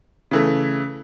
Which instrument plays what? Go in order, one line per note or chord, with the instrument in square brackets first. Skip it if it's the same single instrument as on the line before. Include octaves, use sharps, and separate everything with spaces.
[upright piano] C#3 E3 A3